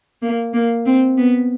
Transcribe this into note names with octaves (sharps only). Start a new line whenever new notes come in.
A#3
A#3
C4
B3